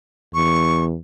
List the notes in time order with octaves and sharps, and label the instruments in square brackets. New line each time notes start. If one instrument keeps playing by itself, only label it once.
[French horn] E2 [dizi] C#6